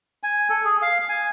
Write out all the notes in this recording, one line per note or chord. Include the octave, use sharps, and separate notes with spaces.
G#5
A4
G#4
F5
G#5